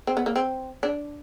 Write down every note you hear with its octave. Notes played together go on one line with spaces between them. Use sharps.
C4
B3
A#3
C4
D4